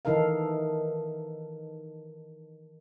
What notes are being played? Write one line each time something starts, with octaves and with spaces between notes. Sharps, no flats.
D#3 E3 D#4 A4 A#4 F5